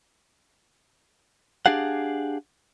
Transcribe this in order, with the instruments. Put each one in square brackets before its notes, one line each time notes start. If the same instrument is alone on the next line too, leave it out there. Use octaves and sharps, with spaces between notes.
[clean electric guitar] D4 G4 G#4 F5 F#5